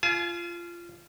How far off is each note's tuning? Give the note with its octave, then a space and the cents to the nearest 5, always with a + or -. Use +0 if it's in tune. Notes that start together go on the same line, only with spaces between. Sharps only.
F4 -20 G#5 +40